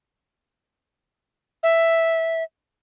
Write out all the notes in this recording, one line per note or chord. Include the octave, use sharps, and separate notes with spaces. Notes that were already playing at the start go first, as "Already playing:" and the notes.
E5